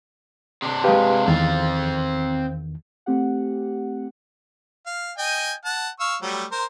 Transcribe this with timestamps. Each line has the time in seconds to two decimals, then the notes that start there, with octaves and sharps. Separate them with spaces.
0.62 C3 D4
0.84 G#3 G4 B4 F5
1.28 E2 D#3 C4 F5 A6
3.06 A3 C4 G4 F#5
4.86 F5
5.18 D#5 G5 G#5
5.65 F#5 A5
6.00 F5 C#6 E6
6.22 F#3 G3 A3
6.51 A#4 C5